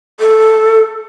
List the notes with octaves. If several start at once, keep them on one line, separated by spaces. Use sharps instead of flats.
A4